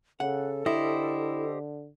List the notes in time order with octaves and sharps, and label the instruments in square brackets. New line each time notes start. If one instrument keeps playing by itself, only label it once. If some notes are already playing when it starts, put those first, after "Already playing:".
[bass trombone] C#3 [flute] A4 [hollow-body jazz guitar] F#5
[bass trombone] D3 [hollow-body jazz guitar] E4 [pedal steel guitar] G4 C5 D#5